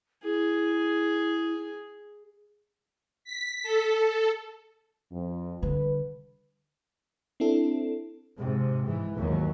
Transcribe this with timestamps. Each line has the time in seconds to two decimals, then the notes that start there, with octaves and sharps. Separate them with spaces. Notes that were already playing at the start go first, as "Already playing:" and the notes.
0.23 E4 G#4
3.24 B6
3.63 A4
5.11 F2
5.62 D3 G3 B4
7.40 C4 D4 E4 A4
8.38 G#2 C3
8.86 G#2 E3
9.17 D#2 G#2 F#3